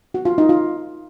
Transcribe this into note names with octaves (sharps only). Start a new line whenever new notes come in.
F#4
F4
D#4
F4